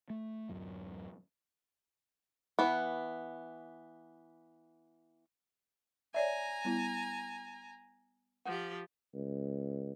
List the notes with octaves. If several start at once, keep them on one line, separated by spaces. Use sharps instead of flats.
A3
D1 F#2
E3 B3
C#5 D5 E5 G#5 A#5
G3 B3 E4
F3 G4 F#5
C#2